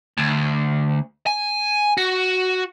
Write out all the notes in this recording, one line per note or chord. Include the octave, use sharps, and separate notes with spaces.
D2
G#5
F#4